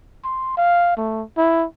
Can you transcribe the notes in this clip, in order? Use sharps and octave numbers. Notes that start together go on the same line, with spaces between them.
C6
F5
A3
E4